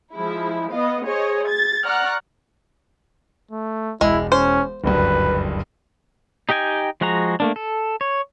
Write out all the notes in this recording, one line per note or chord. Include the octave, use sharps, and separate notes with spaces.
F3 G#3 E4
B3 D#5 F5
G#4 C5 C#5 D#5
G#6 A6
D5 F#5 A#5 C#6 F6 F#6
A3
E1 G#3 E4
C#4 C5
F#1 D2 G2 B4
D#4 G4 D#5 G5 G#5
F3 G#3 F#4 G#4 A#5
A3 A#3 D4
A4
C#5